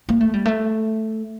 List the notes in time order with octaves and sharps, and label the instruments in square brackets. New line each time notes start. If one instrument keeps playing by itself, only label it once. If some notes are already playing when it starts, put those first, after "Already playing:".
[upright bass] A#3
A3
G3
A3